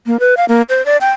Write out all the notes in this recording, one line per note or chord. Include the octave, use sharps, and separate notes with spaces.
A#3
B4
F5
A#3
C5
D5
G5